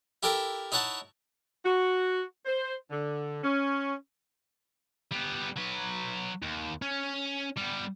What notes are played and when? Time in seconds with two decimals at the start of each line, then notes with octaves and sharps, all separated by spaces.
0.23 E4 G4 A4 A#4 G5 A#5
0.72 D#4 E4 C#5 F#5 A5
1.64 F#4
2.46 C5
2.90 D3
3.43 C#4
5.12 G3 B3
5.57 F#3 B4
6.42 D#2
6.82 C#4
7.57 G3 B3